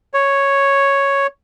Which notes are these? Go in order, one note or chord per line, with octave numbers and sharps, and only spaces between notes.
C#5